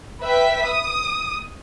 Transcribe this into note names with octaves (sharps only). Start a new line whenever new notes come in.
B4 E5 G5 B6
D#6